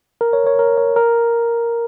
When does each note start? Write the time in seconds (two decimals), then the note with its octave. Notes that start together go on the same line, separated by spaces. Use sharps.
0.21 A#4
0.33 C#5
0.46 C#5
0.59 A#4
0.77 C#5
0.96 A#4